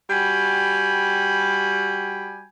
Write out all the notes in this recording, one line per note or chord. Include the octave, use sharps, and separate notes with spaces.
G3 F#4 G5 G#5 B5